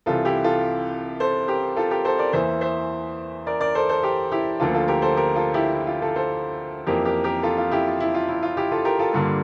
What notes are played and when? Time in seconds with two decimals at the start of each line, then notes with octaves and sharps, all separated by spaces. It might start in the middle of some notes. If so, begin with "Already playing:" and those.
0.06 C2 C3 E3 F4 A4
0.25 E4 G4
0.44 F4 A4
1.20 A4 C5
1.48 G4 A#4
1.77 F4 A4
1.91 G4 A#4
2.05 A4 C5
2.19 A#4 D5
2.33 E2 E3 A#3 C5 E5
2.61 C5 E5
3.47 A#4 D5
3.61 A#4 D5
3.75 A4 C5
3.89 A4 C5
4.03 G4 A#4
4.32 E4 G4
4.60 D2 D3 F3 A#3 F4 A4
4.74 F4 A4
4.88 G4 A#4
5.02 A4 C5
5.16 G4 A#4
5.36 F4 A4
5.54 E4 G4
5.74 E4
5.87 F4
6.02 F4 A4
6.16 A4 C5
6.87 F2 E3 A#3 G4 A#4
7.05 G4 A#4
7.24 G4 A#4
7.43 F4 A4
7.58 F4
7.71 E4 G4
7.86 F4
8.00 E4
8.14 F4
8.28 E4
8.43 F4
8.57 E4 G4
8.72 F4 A4
8.85 G4 A#4
8.99 F4 A4
9.13 G2 D3 G3 A#3 F4